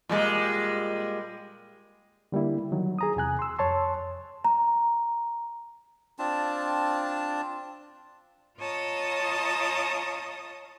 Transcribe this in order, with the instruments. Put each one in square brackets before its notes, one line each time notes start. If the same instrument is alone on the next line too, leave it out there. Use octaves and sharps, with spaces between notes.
[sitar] A#2 G3 G#3
[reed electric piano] D3 G3 A#3 E4
D#3 F#3
G#4 A#5 D#6
E2 C3 G#5 F#6
C6 E6
F2 C#5 A5 C6
[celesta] A#5
[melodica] C4 D4 F4 A5
[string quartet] F4 C#5 D#5 A5 A#5 D#6